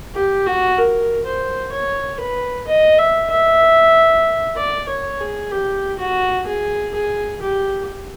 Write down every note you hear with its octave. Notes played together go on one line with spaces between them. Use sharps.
G4
F#4
A#4
C5
C#5
B4
D#5
E5
E5
D5
C#5
G#4
G4
F#4
G#4
G#4
G4